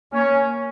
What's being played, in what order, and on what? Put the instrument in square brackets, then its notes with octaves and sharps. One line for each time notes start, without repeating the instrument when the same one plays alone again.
[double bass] A#3 [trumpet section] C#4